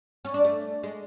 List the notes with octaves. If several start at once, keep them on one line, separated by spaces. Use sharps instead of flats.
C#4
D4
A3
G#3